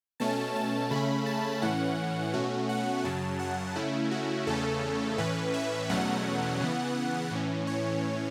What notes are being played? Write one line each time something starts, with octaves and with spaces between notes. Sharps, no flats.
B2 A3 C#4 A5
A5
C#3 A3 C#4 B5
A5
A2 E3 C#4 F#5
B2 A3 C#4 F#4
F#5
F#2 C#3 F#3 A5
F#5
C#3 A3 C#4 E4
F#4
E2 C#3 A3 C#4 A4
A2 E3 C#4 B4
E5
E2 B2 F#3 A3 C#4 F#5
C#3 E3 B3
A2 E3 C#4
C#5